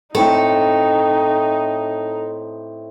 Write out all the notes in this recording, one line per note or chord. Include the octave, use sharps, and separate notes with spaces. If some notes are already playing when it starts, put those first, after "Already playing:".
A2 C4 D#4 A4 C#6